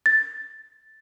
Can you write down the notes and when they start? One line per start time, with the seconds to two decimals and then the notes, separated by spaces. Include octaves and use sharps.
0.06 A6